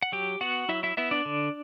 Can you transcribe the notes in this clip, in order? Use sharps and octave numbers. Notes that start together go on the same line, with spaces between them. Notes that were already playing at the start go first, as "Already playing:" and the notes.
F#5
F#3 G4 G5
B3 F#4 F#5
F#3 E4 E5
E4 E5
B3 E4 E5
D4 D5
D3